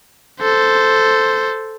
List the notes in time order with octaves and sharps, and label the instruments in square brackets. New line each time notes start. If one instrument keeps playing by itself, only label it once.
[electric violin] A4 C5